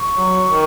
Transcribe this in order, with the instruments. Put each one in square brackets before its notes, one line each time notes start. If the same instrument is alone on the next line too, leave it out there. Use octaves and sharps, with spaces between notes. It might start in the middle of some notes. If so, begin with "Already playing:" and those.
Already playing: [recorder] C#6
[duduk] F#3
D#3